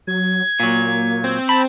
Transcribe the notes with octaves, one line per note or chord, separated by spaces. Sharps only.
F#3 G#6
A#2 F#3 A#3
C4
A5 B5